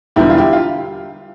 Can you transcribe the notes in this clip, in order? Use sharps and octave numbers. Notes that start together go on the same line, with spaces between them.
E1 E2 D3 G3 E4 G4
F4
E4 G4
F4